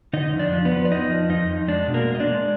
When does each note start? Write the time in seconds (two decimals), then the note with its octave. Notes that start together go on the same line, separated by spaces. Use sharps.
0.13 D3 D#4 D#5
0.33 F2
0.39 D4 D5
0.53 F3
0.65 B3 B4
0.72 F3
0.85 D5
0.91 F2 D#4 D#5
1.10 F3
1.30 F2 D#4 D#5
1.49 F2
1.68 G#3 D4 D5
1.87 B2
1.94 A#3 A#4
2.07 G#3
2.15 D#5
2.20 D4 D5
2.27 G#3